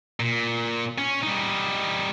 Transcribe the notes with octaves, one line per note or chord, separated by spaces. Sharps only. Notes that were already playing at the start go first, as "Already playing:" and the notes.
A#2
C#4
G3 D#4